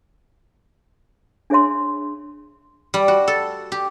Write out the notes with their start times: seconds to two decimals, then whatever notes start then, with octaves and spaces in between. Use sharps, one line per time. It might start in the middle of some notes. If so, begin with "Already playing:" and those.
1.50 D4 G#4 C#5 E5 C6
2.94 G3
3.08 F#4
3.28 A4
3.72 G4